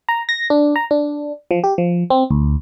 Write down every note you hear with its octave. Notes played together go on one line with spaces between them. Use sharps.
A#5
A#6
D4
A#5
D4
F3
G4
F3
C4
D2